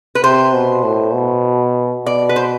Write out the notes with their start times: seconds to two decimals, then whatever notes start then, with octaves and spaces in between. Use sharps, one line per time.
0.15 B4
0.23 C3 C5
0.53 B2
0.84 A2
1.14 B2
2.06 B2 D5
2.29 B4
2.36 C5